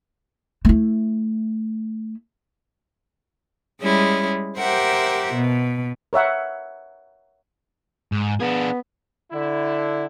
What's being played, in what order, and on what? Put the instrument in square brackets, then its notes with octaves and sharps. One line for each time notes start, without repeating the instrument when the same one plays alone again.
[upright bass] A3 E4
[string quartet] G3 G#3 C#4 E4
G4 A#4 C5 E5 F#5
B2
[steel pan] A#4 C#5 E5 F#5
[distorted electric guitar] G#2
[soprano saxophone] B3 [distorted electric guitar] D4 G#4
[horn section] D3 E4